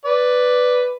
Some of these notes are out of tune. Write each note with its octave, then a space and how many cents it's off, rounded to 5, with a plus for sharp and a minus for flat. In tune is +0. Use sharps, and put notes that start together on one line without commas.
B4 +5 D5 +0